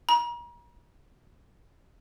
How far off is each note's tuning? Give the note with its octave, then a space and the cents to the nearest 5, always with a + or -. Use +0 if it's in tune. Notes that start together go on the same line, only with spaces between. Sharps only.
A#5 +40